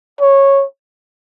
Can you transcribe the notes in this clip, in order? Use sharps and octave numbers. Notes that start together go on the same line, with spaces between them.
C#5